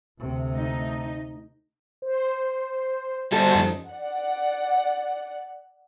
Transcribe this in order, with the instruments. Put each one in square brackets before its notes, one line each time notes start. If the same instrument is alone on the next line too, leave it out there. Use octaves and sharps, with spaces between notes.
[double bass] D2 C3
[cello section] A3 D#4
[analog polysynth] C5
[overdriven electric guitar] G3 A4 [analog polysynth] F#4 C5
[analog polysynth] F#2 F3 D#4
[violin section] D5 F#5